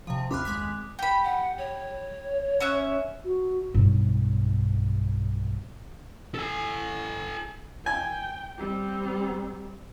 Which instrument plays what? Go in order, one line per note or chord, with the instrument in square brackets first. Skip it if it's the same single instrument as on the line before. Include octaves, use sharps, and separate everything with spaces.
[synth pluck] C3 F3
[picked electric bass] F#1 D#2 C4 [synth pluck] B5 C6 F6 [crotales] D6 F#6
[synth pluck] G#3 G#5 B6
[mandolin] G4 B5
[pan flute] F#5
C#5
[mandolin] C#4 E5 F#6
[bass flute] F#4
[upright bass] B1 G2
[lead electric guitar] A4 G#5
[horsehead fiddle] G5 [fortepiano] G#5
[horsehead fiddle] G3 C4